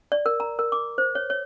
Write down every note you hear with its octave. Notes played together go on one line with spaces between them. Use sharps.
D5
A#4
A#5
A#4
D6
C5
C#5
C#5